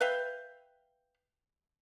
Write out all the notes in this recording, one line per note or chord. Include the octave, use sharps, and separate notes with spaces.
B4 E5 F5 G5